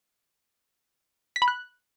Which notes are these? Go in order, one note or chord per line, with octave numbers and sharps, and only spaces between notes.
B6
B5
F#6